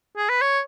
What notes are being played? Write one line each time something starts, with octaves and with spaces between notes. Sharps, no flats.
G#4
B4
C#5